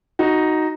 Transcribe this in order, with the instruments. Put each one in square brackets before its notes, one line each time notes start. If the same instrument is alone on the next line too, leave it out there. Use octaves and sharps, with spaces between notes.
[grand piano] D#4 F#4